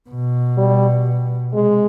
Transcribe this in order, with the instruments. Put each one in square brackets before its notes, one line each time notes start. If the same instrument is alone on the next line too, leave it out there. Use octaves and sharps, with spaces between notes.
[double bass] B2
[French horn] G3
[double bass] C3 [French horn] G#3